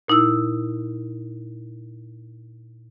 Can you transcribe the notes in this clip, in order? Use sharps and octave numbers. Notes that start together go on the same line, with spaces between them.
A#2 D#4 E4 E6